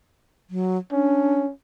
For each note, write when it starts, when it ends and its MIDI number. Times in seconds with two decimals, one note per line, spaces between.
0.50 0.78 54
0.92 1.51 61
0.92 1.43 62